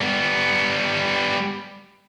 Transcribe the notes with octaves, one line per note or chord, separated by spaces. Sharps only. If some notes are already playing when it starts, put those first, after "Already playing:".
G3 B3